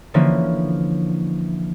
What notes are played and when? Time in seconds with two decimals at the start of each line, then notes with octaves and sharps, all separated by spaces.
0.14 D3 E3 F3 A#3 C#4